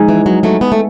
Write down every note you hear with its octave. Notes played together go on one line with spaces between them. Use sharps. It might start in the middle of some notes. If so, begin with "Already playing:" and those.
Already playing: G#3 D#4 G#4
E3
F#3
F#3 A3
B3
A3